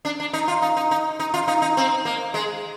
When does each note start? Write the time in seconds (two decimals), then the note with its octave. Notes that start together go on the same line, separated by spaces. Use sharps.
0.05 D4
0.20 D4
0.33 D#4
0.48 F4
0.62 D#4
0.77 D#4
0.91 D#4
1.20 D#4
1.34 F4
1.48 D#4
1.62 D#4
1.77 C4
2.05 A#3
2.34 G#3